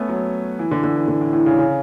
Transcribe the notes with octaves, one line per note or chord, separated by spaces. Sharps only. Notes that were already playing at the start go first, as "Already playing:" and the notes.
Already playing: A3 B3 C#4
F#3
E3
D3
D3
E3
D3
A2
A2
C#3
C#3